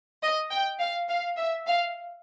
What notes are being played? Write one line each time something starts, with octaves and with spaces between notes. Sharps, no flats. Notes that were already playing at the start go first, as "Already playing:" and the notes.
D#5
G5
F5
F5
E5
F5